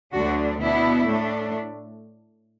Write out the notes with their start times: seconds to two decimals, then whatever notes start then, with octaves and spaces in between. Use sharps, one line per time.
0.12 D2 D3 F#3 D4 F#4
0.60 B2 B3 D4 E4
1.07 A2 A3 D4